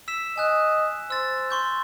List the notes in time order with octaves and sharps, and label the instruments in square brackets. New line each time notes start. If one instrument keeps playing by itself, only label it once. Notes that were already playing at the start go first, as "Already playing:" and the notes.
[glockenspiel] E6 B6 E7
[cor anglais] D#5 [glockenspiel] G#5 F#6
[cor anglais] C5 [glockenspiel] E6 A6
[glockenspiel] C6 C#6 G6